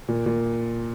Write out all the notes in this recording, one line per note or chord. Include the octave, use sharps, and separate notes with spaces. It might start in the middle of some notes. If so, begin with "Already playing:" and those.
A#2
A#2